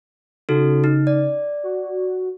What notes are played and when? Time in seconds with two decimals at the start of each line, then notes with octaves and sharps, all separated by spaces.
0.49 C#3 D#4 F#4 A4
0.84 D#4
1.07 D5
1.63 F#4